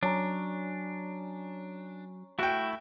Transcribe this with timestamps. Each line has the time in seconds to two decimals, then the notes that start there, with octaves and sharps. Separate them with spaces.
0.03 F#3 C#4 D4 A#5
2.39 A3 E4 F#4 G5